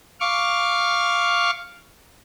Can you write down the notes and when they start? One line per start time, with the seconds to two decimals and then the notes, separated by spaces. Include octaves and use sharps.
0.20 F5 C#6 D6 F6